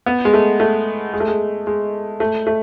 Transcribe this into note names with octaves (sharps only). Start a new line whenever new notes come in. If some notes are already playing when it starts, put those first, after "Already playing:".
B3
G#3
A3
A3
G#3
A3
G#3
G#3
A3
A3